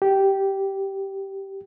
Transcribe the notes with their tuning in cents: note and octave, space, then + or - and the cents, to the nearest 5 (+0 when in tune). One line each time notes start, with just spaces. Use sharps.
G4 -10